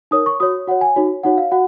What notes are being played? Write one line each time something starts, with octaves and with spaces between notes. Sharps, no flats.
D#4 A#4 C#5 D#6
C#6
F#4 C#5 D#6
F#4 C#5 F#5
G#5
D#4 F#4 C#5
D#4 F#4 C#5 F#5
F5
F#4 F#5